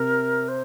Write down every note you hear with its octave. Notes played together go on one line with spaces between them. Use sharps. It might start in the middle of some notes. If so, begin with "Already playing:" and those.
Already playing: C3 A#4
C5